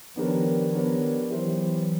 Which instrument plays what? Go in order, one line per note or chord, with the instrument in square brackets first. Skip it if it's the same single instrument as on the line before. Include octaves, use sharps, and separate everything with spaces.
[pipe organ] D#3 F3 [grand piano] B3 D4 G4 A#4 C#5
[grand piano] B3 D4 G4 A#4 C#5
[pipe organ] E3 F#3 [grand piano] B3 E4 G4 C5